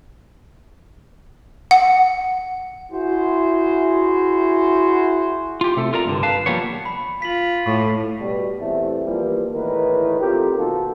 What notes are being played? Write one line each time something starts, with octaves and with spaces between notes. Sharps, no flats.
F#5
E4 F#4 G#4 C5
F4 G4
C3 A3 A4
F4 A#4 D5 A#5
C2 G2 D3
B4 F5 A5
F3 G3 A#3 B3 C#5
B5
F4 B6 F#7
A2 B5 C#6 D6
B2 G3
E2 C3 A3
E3 F3 G3 A#3
E2 A2 D#3 E3 A#4 B4
C4 F4 G4 A4 A#4
B2 D#3 A#3 F4 F#4 A4